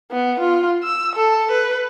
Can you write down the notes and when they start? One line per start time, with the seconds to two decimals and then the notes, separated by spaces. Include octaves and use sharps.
0.12 B3
0.40 F4
0.83 E6
1.15 A4
1.52 B4